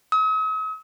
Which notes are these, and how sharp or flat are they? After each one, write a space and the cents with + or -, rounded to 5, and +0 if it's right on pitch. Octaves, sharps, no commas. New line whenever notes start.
D#6 +45